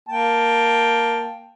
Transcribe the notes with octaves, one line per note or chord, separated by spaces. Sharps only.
A#3 G5 A5